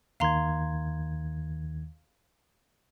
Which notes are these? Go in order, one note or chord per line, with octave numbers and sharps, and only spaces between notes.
D#2 D#3 F5 A#5 C6 G#6